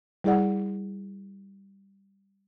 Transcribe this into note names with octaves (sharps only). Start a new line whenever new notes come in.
G3 E4 G#4 D5 F#5